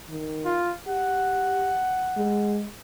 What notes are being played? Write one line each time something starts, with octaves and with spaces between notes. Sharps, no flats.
D#3
F4
G4 F#5
G#3